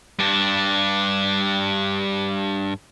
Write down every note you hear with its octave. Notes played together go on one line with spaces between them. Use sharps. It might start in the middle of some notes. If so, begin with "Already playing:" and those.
G2 D4